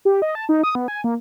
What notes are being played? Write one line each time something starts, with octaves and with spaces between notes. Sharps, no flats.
G4
D#5
A5
D#4
D#6
B3
G#5
A#3